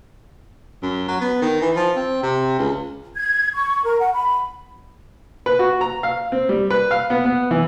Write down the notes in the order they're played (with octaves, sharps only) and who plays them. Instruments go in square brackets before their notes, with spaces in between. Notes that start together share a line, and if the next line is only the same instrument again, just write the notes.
[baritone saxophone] F#2
F#3
B3
D#3
E3
F3
C4
C3
C#2
[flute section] G#6
C#6
A#4
F#5
B5
[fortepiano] B4
F#4
A#5
F5
C4
G3
B4
F5
B3
B3
E3